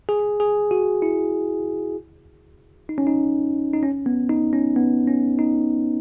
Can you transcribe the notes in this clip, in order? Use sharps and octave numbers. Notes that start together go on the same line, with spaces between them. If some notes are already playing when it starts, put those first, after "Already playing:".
G#4
G#4
F#4
E4
D#4
C#4
D#4
D#4
C#4
B3
D#4
C#4
B3
C#4
D#4